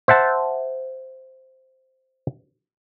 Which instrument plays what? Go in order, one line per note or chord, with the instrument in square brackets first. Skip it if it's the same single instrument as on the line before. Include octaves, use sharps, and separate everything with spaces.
[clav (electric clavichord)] C5 E5 F#5 A5